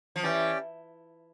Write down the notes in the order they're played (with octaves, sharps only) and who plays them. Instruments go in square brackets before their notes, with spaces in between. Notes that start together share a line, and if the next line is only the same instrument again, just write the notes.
[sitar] F3
[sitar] E3 [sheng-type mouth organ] C#4 G4 D5 G5